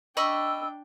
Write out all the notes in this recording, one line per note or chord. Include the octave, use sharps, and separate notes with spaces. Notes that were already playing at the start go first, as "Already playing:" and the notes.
D4 D#5 G5 B5 C#6 E6